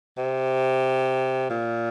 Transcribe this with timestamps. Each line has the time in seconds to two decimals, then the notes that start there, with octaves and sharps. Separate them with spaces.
0.17 C3
1.50 A#2